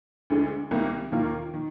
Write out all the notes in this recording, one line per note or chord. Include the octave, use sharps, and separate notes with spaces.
D2 D3 G#3
C2 C3 D#3 A#3
D#2 D#3 A#3 F4 A#4
D#3